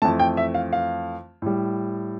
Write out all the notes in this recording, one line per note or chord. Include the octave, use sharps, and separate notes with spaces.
F2 E3 A3 A5
G5
E5
F5
F5
A2 G3